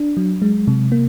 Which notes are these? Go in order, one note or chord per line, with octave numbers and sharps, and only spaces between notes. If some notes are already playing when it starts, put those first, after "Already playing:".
Already playing: D4
F#3
G#3
C3
A#3